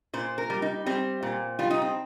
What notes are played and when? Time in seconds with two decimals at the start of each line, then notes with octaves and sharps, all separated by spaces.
0.13 A#2 C5
0.38 A#4
0.50 G3
0.62 D#4
0.86 G3 C4
1.23 A#2
1.59 G3 F4
1.70 D#4
1.82 C4